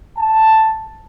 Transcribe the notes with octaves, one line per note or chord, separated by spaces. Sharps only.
A5